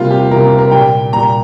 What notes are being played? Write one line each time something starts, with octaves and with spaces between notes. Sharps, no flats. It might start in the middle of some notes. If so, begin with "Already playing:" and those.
Already playing: C3 G3 A#3 F4
G4
C3 G3 A#3 A#4
G4
A#4
A#2 G3 A#3 G5
A#2 G3 A#3 A#5